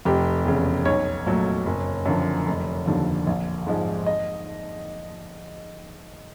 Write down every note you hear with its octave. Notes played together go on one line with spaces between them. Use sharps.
F1 G4
E2 C#3
B1 C#5
A#2 F#3 A3
F#1
F#2 D3 F3
F1
D#2 D3 F3
A#1
G#2 F3 G#3
D#5